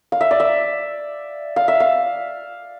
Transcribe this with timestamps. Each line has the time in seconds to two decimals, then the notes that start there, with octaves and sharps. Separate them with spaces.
0.12 F5
0.21 E5
0.31 D5
0.40 E5
1.56 F5
1.68 E5
1.80 F5